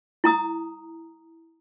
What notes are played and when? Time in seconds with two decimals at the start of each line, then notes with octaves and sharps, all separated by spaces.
0.24 E4 A#5 D#6